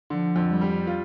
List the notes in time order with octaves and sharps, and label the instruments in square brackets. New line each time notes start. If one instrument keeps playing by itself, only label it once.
[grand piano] D3 [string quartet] F3
[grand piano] F2
[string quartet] G3
[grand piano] G3
F4